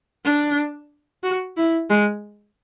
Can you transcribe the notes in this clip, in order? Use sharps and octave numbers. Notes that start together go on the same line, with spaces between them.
D4
F#4
E4
G#3